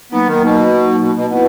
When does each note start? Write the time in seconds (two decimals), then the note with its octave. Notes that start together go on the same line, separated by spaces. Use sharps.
0.12 F#3 A#3 B3 D#4
0.27 D#3
0.42 B2
1.01 B2
1.15 B2
1.30 B2 B3 E4 B4 F#5